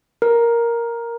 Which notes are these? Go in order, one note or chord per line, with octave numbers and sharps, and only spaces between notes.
A#4